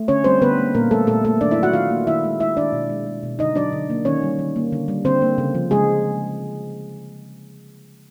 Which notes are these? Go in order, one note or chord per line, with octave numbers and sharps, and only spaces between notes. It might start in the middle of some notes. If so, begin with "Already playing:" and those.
Already playing: A3
D3 C#4 C#5
G3 C4 C5
D3 B3 B4
A#3
A#2 A#3 A#4
G3 A3 A4
A#2 A3 A4
A3 A#3 A4
D#3 D4 D5
E4 E5
F#3
F#4 F#5
D#3 F4 F5
A#3
D#3 E4 E5
G#3
G#3 E4 E5
D#3 D4 D5
B2
G#3
G#3
B2
D3 D#4 D#5
F#3 D4 D5
D3
A#3
D#3 C#4 C#5
G3
D#3
A#3
D3
G3
D3 C4 C5
A#3
C#3
F3
C#3 G#3 G#4